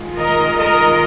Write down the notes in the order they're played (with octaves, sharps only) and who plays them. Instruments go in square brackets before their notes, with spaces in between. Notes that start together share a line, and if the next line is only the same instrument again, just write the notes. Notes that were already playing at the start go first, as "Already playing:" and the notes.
Already playing: [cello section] D#3 G#3 F4
A#4 D#5
A#4 D#5